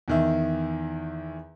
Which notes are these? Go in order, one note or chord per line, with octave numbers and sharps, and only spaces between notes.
E2 D#3 E5